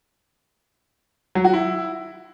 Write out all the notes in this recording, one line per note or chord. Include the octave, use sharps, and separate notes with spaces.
F#3
F#4
E4